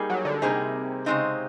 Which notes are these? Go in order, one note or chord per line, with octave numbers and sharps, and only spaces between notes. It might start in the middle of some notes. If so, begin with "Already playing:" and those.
Already playing: G3 A#3 D#4 G#4
F#3
D3
C3 G3 A#3 D#4 G#4
C#3 F3 G#3 C4 D#4